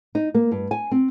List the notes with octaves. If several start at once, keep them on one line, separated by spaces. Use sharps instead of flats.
D#4
A#3
G2
G#5
C4